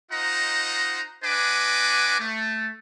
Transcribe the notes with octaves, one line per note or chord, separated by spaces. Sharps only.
D#4 F4 C5 D#5 F#5 A#5
D4 B4 D#5 F#5 G#5 D6
A3